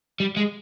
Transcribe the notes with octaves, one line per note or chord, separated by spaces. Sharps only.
G3
G#3